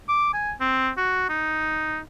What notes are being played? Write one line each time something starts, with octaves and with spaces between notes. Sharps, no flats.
D6
G#5
C4
F#4
D#4